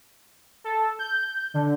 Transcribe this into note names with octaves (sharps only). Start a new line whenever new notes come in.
A4
G6
D3